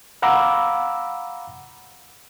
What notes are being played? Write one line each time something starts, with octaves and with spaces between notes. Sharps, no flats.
F5 F#5 A#5 B5 D6 E6